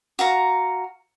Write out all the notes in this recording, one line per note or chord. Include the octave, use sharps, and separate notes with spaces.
F#4 F5 A#5